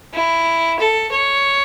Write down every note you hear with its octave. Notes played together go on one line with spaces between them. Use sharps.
E4
A4
C#5